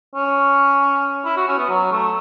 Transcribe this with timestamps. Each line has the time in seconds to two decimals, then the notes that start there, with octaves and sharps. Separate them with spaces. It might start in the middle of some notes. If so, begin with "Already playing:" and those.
0.15 C#4
1.25 E4
1.37 F#4
1.48 C#4
1.58 B3
1.69 F#3
1.92 A3